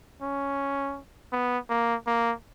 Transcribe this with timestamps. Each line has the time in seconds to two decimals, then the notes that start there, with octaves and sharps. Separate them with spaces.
0.22 C#4
1.32 B3
1.70 A#3
2.07 A#3